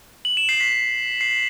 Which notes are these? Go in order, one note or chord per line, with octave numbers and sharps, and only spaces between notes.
F#7
E7
C7
B6
C7